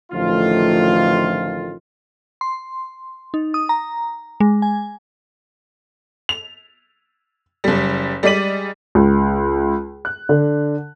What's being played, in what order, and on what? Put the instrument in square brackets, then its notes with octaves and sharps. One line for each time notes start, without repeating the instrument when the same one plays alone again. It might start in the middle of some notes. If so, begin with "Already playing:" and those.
[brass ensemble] A1 D3 D#3 F3 A3 F4
[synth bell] C6
D#4
D#6
A#5
G#3
G#5
[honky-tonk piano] F7
F#1 G3
G3 G#3 D5 B6 D#7 F#7
[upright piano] C#2
F#6
D3